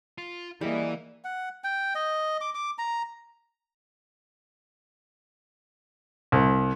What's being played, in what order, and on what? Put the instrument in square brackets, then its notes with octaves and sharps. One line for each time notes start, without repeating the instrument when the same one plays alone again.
[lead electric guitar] F4
[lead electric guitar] E3 [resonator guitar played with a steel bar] G3 [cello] A#3 [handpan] E4 G#4 D#5
[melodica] F#5
G5
D#5
D6
D6
A#5
[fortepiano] C2